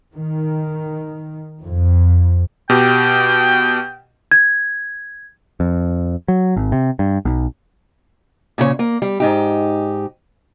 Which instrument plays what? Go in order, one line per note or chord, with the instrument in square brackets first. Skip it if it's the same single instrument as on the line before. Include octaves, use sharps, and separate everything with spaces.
[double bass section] D#3
F2
[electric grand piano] B2 G4 [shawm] G5
[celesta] G#6
[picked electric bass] F2
F#3
G#1
C3
G2
B1
[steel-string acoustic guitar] A#2 C#3 A4 C#5
A#3
G3
G#2 D#4 G4